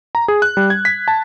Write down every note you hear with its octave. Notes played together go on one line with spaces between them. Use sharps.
A#5
G#4
F#6
G3
G#6
B6
A5